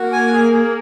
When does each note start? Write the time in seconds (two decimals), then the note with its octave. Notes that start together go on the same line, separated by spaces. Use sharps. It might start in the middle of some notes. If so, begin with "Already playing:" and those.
Already playing: A#3 F#4
0.12 G#5
0.33 G#4
0.53 G#4